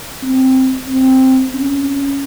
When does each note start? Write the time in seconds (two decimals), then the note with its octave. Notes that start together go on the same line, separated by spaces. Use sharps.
0.23 C4
0.89 C4
1.55 C#4